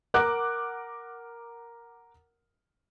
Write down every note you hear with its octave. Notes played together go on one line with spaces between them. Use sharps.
A#4 F#5 D6 F#6